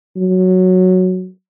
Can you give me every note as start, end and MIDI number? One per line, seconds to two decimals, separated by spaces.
0.17 1.28 54